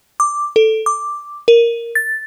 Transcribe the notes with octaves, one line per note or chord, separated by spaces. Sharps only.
D6
A4
D6
A#4
A6